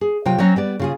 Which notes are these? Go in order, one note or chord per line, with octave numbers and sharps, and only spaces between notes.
G#4
C3 F#3 F4 G5
F#3 C4 C#4 C#5
G3 B3 D5
C#3 F4 G#4